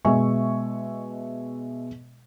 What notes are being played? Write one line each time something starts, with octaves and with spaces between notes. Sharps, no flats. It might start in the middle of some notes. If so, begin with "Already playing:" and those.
B2 G#3 E5 G#5 C#6